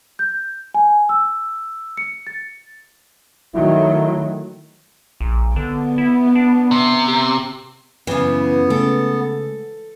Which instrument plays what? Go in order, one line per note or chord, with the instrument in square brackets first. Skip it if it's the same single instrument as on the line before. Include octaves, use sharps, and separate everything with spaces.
[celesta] G6
G#5
E6
C#7
A6
[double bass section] D#3 F#3 A3 [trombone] E4
[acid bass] A#1
[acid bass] D3 [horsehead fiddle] B3
[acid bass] E4
D4
[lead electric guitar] C3
[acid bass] G4
[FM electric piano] F#2 [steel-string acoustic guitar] C#3 E3 [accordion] B3
[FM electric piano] C#3 G#3 A3 [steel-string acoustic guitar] A4